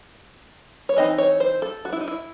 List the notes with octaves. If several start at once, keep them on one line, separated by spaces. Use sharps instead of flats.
C#5
E3 C4 D#4 D#5
C#5
C5
A4
F#4
E4
D#4
E4